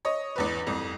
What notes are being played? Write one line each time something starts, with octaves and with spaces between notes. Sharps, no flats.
C#5 D#5
A1 E2 B4
C2 F2